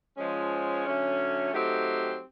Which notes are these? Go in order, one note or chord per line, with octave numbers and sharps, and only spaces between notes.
F3 G#3 C#4
D3 F#3 A3 C#4
F#3 A3 C4 D#4 G4